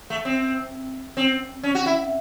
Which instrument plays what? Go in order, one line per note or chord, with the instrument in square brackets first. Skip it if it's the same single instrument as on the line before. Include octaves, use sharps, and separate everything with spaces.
[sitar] A3
C4
C4
C#4
F#4
E4